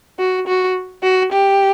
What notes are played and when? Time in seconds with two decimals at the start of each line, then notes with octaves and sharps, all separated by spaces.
0.19 F#4
0.48 F#4
1.03 F#4
1.32 G4